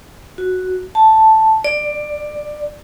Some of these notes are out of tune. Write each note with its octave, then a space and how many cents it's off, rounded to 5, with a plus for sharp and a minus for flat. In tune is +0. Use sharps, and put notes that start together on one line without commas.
F#4 +0
A5 +0
D5 +15